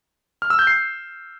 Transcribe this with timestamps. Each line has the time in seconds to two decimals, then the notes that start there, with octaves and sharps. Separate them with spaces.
0.42 F6
0.50 E6
0.59 G6
0.67 C7